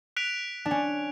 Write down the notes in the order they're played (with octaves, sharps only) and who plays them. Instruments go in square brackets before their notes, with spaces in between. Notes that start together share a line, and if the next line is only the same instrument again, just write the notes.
[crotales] F#6 B6 D7 F7
[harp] D4
C#4